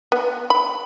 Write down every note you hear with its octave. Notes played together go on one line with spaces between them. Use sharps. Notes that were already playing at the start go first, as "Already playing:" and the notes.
B3
B5